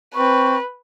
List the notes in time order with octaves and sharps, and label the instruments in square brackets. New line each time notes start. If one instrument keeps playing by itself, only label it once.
[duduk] C4 [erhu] B4 [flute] C#6